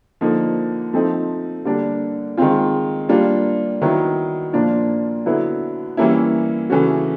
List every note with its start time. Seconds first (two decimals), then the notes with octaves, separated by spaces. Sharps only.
0.21 D3 F3 A#3 D#4
0.93 F3 A3 C4 D#4
1.65 D3 G3 A#3 D4
2.37 D#3 G#3 C4 F4
3.09 G3 A#3 D4 F4
3.81 D#3 F#3 B3 E4
4.53 A#2 F3 A#3 D4 F4
5.26 D3 F#3 B3 E4
5.97 E3 G3 A#3 C#4 E4
6.70 C#3 E3 A3 C#4 F#4